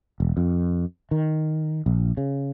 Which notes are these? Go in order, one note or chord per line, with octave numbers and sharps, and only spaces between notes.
E1
F2
D#3
A#1
C#3